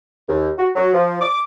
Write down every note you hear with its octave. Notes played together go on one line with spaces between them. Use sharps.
D#2
F#4
F#3
F3
D6